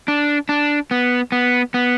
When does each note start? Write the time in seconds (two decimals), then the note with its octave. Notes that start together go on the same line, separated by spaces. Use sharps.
0.08 D4
0.49 D4
0.91 B3
1.32 B3
1.74 B3